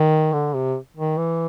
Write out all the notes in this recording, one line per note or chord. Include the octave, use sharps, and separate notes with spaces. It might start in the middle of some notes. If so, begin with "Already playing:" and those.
Already playing: D#3
D3
C3
D#3
E3